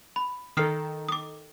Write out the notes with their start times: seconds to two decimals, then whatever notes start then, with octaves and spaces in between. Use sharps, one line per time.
0.16 B5
0.57 D#3 A4 D#6 F6 C7
1.09 D6 D#6